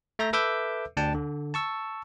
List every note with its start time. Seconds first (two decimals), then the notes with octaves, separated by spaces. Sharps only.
0.19 A3 E5 A#5 G6 A#6
0.33 A4 B4 E5 D6 E6 G6
0.97 D2 D4 G5 A5
1.14 D3
1.54 A5 C#6 E6